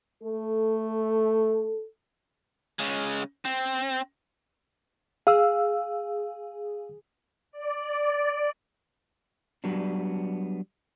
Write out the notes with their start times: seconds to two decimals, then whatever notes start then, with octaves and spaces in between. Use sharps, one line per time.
0.23 A3 A4
2.79 C#3 G#3
3.45 C4
5.27 G#4 F5 E6
7.52 D5
9.64 F#3 G3 B3 D4